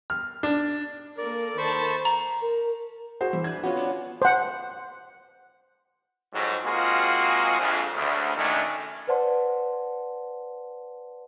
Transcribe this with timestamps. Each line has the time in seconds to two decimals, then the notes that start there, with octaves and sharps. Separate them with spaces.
0.10 F6
0.43 D4
1.18 A#3 A4 A#4 D5
1.58 D#3 C5 A5 B5 C#6
2.05 A#5
2.42 A#4
3.21 F#4 G#4 C5
3.33 E3 E5
3.44 D4 B4 G#6
3.63 B3 C#4 F4 F#4
3.77 C#4 D4 A5
4.22 C5 F#5
6.33 F2 G#2 F#3
6.64 G#3 A#3 C4 F4 F#4 G#4
7.59 A#1 F2
7.94 D2 C#3
8.36 F#2 A#2 D#3 A3 C#4 D4
9.08 B4 C5 D5 F#5 A5 C6